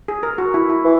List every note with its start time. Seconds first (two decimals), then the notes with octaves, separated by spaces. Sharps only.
0.08 G#4
0.23 A#4
0.38 F#4
0.54 E4
0.70 E4
0.85 E3